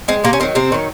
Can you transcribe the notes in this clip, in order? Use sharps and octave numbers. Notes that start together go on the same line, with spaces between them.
G#3 C4
C3 A#3
C#4
D#3 F#3 C4
C3 C4
D#3 F#3